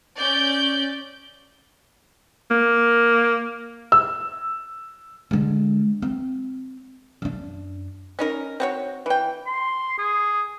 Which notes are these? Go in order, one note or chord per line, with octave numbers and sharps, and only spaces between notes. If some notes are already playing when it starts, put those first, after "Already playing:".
C#4 D5 G6
A#3
E6
D3 G#3
C4
F#2 D4
C#4 D#4 A#4
C4 F#4 C#5
E3 G5
C6
G#4